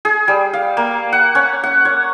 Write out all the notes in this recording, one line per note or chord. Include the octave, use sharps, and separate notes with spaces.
G#4
G3
F5
A#3
F#5
C#4
F#5
C#5